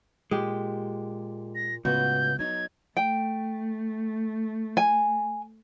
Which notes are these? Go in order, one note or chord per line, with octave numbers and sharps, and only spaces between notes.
A#2 G#3 G4
A#6
C#2 A2 B3 F#4 G6
F#3 D#4 G#6
A3 G5
G#5